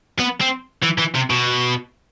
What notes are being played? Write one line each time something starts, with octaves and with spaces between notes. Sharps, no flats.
B3
C4
E3
E3
C3
B2